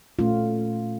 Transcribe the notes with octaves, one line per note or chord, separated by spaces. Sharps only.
A#2 A3 C#4 F4